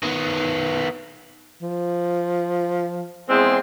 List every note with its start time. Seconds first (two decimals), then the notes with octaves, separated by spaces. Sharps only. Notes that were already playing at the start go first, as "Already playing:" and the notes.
0.03 D#3 B3
1.62 F3
3.29 E2 G#3 C4